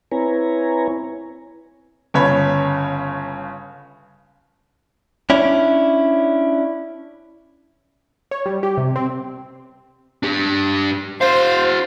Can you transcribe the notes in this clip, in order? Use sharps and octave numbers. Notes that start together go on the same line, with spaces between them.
C4 E4 B4 C#5 G#5 A#5
G1 C#3 C#5 B5
C#4 D4 E4
C#5
G3
G4
C3
C4
D4 G4
F#4 C5 F5